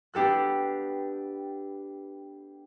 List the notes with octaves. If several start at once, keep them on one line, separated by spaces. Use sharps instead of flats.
B3 D4 G4 A4 F#6